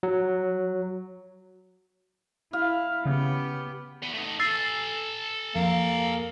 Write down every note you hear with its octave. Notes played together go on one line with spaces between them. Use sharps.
F#3
E4 F5
C#3 B3 G4
E2 B3
A3 D#4
A4 G#5 E6 A6 C7
F2 A#3